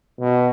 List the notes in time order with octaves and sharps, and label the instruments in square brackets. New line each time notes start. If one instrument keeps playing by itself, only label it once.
[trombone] B2